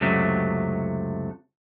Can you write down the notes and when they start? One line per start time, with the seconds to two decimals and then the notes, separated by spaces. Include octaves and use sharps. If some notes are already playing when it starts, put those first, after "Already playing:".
0.01 C#2 F#2 C3 F#3 A3